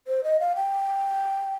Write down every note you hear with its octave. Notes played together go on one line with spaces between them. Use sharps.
C5
D#5
F5
G5